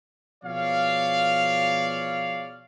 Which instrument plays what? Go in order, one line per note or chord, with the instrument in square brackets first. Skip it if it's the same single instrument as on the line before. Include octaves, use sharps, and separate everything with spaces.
[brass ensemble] B2 F3 G#4 C#5 D5 F5